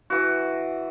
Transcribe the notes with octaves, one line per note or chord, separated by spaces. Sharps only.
E3 F#4